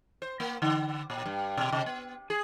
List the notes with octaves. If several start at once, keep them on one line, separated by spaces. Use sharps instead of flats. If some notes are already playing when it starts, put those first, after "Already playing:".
C5
A#3
D3
A#2
G2
B2
C3
B3
G#4